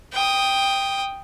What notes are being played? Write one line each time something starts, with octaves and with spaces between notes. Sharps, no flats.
G5 D#6